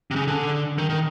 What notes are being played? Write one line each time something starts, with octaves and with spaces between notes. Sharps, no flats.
C3
C#3
D3
D#3
D#3